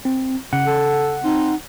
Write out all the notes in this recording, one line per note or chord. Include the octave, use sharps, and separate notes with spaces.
C4
C#3 F#5
A4
C4 D#4